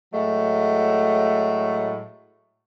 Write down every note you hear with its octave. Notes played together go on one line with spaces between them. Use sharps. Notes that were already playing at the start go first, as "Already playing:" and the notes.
A2 F#3 G#3 A3